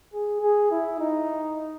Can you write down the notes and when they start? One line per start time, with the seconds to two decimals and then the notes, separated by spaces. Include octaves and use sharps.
0.13 G#4
0.42 G#4
0.71 E4
1.00 D#4